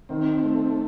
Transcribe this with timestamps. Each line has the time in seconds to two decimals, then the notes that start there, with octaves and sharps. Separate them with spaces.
0.09 D#3 C4
0.43 A3